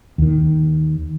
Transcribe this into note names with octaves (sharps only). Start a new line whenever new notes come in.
D#2 D#3